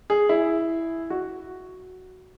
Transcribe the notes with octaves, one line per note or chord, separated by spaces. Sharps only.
G#4
E4
F#4